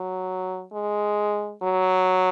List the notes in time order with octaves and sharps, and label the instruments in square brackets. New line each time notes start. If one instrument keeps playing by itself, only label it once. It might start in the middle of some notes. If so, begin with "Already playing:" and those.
Already playing: [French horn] F#3
G#3
F#3